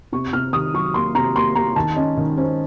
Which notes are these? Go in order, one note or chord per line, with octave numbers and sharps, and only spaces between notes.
C3 C#6
C3 F6
D#3 D#6
F#3 C#6
A#3 C6
C3 A#5
A#3 C6
A#3 A#5
D#3 A5
C#4 D#5
D#3
C#4 C5